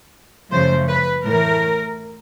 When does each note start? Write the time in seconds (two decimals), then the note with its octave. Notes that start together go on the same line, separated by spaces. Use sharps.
0.50 F#2 C#3 F3 A3 C5
0.88 B4
1.25 A2 E3 A3 A#4